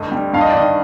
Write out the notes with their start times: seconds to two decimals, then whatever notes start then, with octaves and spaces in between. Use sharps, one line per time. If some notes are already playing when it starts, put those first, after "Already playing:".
Already playing: D2 G2 D#5
0.12 G3
0.33 G2 F5
0.41 D#5
0.50 D5
0.55 D#3 D#5